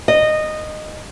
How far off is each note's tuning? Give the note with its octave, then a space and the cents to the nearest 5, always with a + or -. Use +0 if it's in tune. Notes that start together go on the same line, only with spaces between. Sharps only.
D#5 -15